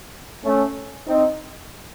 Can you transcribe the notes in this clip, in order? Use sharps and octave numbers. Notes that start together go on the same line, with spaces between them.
A3 C#4
C4 D#4